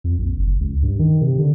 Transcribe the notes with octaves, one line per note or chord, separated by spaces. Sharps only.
F2
A#1
F#1
C#2
G2
D#3
C3
D3